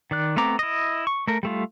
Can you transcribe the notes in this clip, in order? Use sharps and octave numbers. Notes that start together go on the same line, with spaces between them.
D#3 D5 F#6
A3 B3 C4 A#5 D6
E4 D#5
C#6
A3 A#4
G3 A3 F4